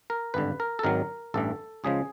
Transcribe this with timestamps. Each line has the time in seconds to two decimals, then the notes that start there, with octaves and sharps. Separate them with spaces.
0.10 A#4
0.34 G#1 G2 D3 B4
0.60 A#4
0.79 A4
0.83 G#1 G#2 D#3 F#3 A#4
1.34 A1 G2 E3 A4
1.84 C#2 C#3 F3 G#3 G#4